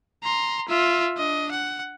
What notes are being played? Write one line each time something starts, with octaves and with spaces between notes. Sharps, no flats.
A#5 C6
F4 E5
D4 D#5
F#5